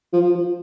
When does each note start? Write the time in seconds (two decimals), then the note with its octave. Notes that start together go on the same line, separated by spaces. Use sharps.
0.13 F3
0.35 F3